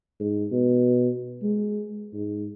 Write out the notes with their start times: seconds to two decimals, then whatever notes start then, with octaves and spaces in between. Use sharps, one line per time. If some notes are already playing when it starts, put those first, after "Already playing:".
0.20 G#2
0.51 B2
1.43 G#3
2.14 G#2